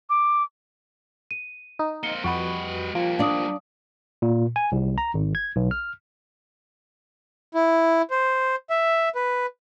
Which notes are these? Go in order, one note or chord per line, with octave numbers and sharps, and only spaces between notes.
D6
D#7
D#4
A#3 C4 C#7 G7
F2 G3 F#4 B4 D#5 C#6
F3 G3 A#3
D4 D5 F5 D#6
A#2
G#5
C2
A#5
G#1
G#6
B1
F6
E4
C5
E5
B4